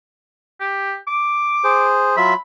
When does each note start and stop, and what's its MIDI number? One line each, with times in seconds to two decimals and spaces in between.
0.60 0.95 67
1.07 1.90 86
1.64 2.16 68
1.64 2.16 72
2.17 2.34 54
2.17 2.34 65
2.17 2.34 76
2.17 2.34 83